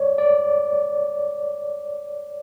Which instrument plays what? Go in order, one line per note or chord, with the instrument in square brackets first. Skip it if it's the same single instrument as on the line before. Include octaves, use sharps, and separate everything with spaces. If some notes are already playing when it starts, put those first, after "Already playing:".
Already playing: [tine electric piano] C#5 D5
D5